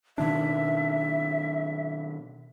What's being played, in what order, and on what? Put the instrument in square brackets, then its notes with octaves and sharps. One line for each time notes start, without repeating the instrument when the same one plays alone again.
[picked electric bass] B2 D#3 D4 [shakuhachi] E5